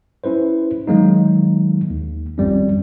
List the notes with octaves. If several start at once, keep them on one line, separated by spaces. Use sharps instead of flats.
C#4 E4 B4 C5
D#3 F#3 G#3 A#3 D#4
D#2
G#1 F2 G3 C#4